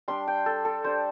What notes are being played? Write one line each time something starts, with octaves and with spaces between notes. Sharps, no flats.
G3 D4 C6
G5
A4
A4
G3 D4 C5